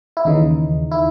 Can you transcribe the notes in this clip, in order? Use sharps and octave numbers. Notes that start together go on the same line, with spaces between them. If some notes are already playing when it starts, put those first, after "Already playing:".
E4
D#2 C#3 E3 D#4
E4